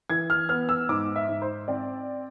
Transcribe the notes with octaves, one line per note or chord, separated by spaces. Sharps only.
E3 G#6
F6
B3 F6
E6
G#2 D6
E5
G#2
C5
C4 D5